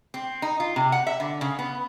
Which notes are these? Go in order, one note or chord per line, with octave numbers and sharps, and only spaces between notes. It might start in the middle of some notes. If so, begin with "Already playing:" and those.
C4
D#4
F4
C3
F#5
E5
D3
C#3
B3